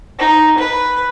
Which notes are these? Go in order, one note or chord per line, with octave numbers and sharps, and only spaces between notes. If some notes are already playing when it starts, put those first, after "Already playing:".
D#4
B4